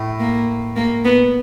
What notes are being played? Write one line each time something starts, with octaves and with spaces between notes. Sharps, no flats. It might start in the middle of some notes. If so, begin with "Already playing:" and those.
Already playing: A2
A#3
A#3
B3